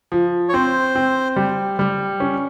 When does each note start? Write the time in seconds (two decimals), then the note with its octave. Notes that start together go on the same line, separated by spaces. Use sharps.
0.12 F3
0.49 C#5
0.53 C4 C5
0.95 C4
1.36 G3
1.79 G3
2.20 C#4